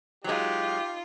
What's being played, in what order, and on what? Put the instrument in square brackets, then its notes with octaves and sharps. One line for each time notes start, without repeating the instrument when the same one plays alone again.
[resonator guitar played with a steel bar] F#3 G#3 [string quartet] D#4 F4 [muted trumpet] G4